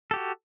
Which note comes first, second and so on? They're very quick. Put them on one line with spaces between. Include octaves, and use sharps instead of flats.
A4 G4 F#4